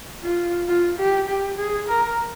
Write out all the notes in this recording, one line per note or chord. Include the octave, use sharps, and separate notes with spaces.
F4
F4
G4
G4
G#4
A#4